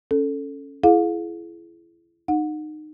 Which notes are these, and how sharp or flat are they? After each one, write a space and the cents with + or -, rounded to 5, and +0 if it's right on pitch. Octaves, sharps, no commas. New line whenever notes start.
C#4 +0 A4 +0
E4 +30 G#4 +30 F5 +35
D#4 -25 F#5 -25